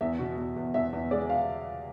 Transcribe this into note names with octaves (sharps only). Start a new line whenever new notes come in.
E2 E5
B2
E2
E2
E2 E5
E2
G#3 D5
F5